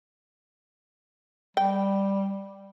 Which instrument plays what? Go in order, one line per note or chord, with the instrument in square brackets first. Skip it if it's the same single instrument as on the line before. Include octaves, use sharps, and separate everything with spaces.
[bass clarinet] G3 [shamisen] G5